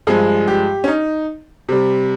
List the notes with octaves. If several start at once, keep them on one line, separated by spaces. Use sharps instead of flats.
G2 F3 G#3 G#4
G4
C#4
D#4
C3 G3